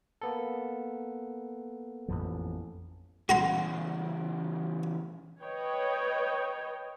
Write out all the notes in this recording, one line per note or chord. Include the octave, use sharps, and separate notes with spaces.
A#3 B3 A4
A1 F2 F3
E2 C#3 F#4 A#5 C6
B4 C#5 D#5 G5